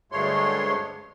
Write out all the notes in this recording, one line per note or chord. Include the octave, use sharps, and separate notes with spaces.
D2 G2 G#3 A3 C#5 C6